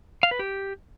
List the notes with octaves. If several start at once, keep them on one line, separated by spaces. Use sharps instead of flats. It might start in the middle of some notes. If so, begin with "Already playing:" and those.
F5
B4
G4